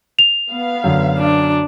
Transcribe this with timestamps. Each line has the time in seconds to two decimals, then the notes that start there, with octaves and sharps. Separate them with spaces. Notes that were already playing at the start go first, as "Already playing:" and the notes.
0.19 F7
0.51 B3 F5
0.84 F#2 D3
1.18 D4